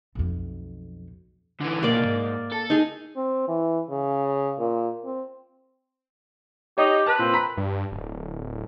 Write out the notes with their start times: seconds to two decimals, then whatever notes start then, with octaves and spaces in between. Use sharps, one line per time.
0.15 B1 F2
1.61 D3 E3
1.83 B1 A#2 A#3 D5
2.01 B1 G#2
2.52 A4
2.70 D#4 G#4
3.16 C4
3.48 E3
3.90 C#3
4.59 A#2
5.04 C4
6.78 D#4 G4 C#5 D#5
7.06 B4 A5
7.19 A#2 C4
7.34 A#5 B5 B6
7.57 G2
7.92 D1